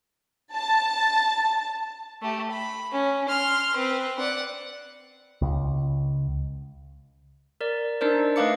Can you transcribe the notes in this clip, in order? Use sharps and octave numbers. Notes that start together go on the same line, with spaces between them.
A5
A3 G4
B5
C#4
C6 F6
C4 B4
D5 F#5
C#2
A#4 D5
D4 D#4 A#4 C5 D5
A3 B4 D#5 F5 D6 C#7